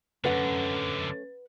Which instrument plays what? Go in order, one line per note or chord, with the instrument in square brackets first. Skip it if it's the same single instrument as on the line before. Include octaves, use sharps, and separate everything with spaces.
[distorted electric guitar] F#2 D3 [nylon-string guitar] A3 C#4 [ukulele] B4 F#5